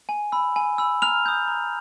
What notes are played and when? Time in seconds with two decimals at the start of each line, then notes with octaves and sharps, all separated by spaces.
0.09 G#5
0.32 B5 E6
0.56 G#5
0.78 B5 E6
1.02 A#5 F6 F7
1.26 D#6 G6
1.48 A#5